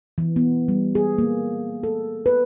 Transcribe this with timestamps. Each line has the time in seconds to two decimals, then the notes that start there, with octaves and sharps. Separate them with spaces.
0.18 E3
0.36 B3
0.68 G3
0.95 G#4
1.18 A#3
1.83 A4
2.26 B4